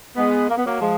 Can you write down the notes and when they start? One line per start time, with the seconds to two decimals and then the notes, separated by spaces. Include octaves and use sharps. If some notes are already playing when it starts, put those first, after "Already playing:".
0.16 G#3 B3
0.49 A#3
0.57 B3
0.66 F#3 A#3
0.80 F3 G#3